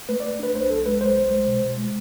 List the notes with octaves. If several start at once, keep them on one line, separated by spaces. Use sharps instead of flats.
A3 B4
D5
A3
D4 B4
B1 C5
B1 A4
G#3 B4
B1 C5
B1
G#3
B2
B2
G#3